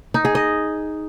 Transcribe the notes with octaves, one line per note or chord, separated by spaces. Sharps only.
D#4
G#4
D#5